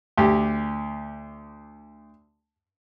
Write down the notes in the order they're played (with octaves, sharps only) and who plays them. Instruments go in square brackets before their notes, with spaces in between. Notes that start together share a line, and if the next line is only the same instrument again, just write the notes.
[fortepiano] D2 G4